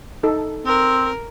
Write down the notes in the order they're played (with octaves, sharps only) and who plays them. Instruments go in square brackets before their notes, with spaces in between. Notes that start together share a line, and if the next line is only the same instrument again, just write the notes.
[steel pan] D#4 A4
[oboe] C4 [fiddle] A#4